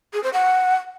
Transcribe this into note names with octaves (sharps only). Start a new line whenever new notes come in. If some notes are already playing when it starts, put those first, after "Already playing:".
G#4
C5
F#5